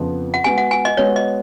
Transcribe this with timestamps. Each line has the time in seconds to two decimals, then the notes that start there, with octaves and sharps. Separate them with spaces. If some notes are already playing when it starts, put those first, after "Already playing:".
Already playing: F2 C#3 F3 B3
0.34 F#5
0.44 G#3 B3 F#4 G#5
0.58 F#5
0.71 G#5
0.85 D#5
0.97 G#3 B3 F#4 C#5
1.16 D#5